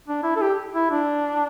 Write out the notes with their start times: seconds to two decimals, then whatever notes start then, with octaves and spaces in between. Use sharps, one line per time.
0.08 D4
0.24 E4
0.36 A4
0.41 G4
0.75 E4
0.91 D4